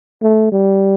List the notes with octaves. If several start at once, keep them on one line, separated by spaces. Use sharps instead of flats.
A3
G3